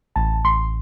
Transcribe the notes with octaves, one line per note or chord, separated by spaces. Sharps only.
A1 A5
A1 C6